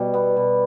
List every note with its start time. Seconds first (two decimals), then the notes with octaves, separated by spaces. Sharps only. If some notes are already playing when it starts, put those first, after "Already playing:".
Already playing: B2 G3
0.14 B3
0.37 B2